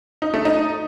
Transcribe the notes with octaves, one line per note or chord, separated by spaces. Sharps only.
D#4
A3
D#4